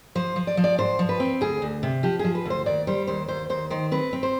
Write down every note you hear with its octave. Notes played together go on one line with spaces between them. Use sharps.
F3 C5
F3
D5
F3
D5
G#2 C5
F3
B4
C4
D2 G#4
D2
C3
F3 G4
F3 G#4
B4
D2 C5
D#2 D5
G3 C5
D#2 C5
D#2 C5
D#2 C5
D#3 C5
C4 B4
C4
C5